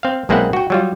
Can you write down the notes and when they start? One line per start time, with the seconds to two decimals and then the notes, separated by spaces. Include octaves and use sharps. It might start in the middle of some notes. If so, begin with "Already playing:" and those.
0.03 C4 F5
0.29 B1 G#3 A#3 C4 E4 F#5
0.53 F#4 G5
0.70 F#3 G3 F4